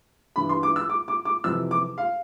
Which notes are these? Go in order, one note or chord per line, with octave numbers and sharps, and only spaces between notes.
G2 E3 B5
C6
D6
E6
D6
D6
D6
F2 C3 E3 E6
D6
F5